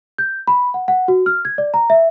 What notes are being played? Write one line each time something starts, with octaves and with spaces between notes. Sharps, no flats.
G6
B5
F#5
F#5
F#4
F6
G#6
D5
A#5
E5